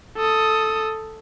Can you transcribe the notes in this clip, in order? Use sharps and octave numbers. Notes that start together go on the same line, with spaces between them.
A4 D#6